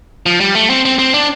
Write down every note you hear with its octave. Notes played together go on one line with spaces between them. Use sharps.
F3
G3
A3
C4
C4
C4
D4